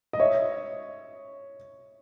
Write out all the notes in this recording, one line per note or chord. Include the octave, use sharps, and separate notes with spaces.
D#5
C#5 E5